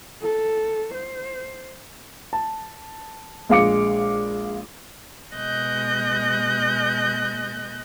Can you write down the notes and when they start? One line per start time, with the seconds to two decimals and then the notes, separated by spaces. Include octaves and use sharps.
0.22 A4
0.94 C5
2.33 A5
3.49 A#1 G#3 F5 D6 C#7
5.36 B2 G#3 D#5 F#6 G6 A#6